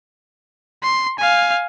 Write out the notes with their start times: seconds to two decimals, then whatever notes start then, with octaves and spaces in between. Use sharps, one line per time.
0.83 C6
1.19 F5 G#5